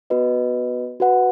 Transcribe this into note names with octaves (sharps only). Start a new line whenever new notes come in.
B3 F#4 B4 D#5
F#4 B4 F#5